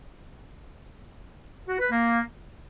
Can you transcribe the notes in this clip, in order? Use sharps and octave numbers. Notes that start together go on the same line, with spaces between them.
F#4
B4
A#3